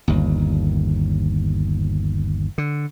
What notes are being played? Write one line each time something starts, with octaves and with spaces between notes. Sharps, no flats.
G1 D#2
D3